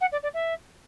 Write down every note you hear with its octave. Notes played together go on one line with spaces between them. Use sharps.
F#5
D5
D5
E5